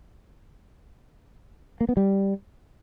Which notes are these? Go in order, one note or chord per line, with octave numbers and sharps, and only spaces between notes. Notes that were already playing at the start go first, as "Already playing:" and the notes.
A#3
B3
G3